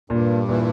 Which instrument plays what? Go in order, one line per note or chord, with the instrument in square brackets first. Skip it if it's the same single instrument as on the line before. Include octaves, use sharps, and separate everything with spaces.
[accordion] G2 [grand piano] A#2
[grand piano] A#2 [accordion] E3